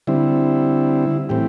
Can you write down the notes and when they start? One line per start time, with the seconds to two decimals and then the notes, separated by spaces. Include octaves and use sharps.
0.07 D3 G3 C4 E4
1.29 A2 E3 C4 G4